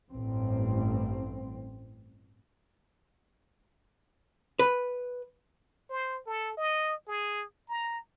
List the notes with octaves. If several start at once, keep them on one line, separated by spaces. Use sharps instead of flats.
A1 G2 C4
B4
C5
A4
D#5
G#4
A#5